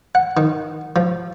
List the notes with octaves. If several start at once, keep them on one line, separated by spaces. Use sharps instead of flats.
F#5
D#3
F3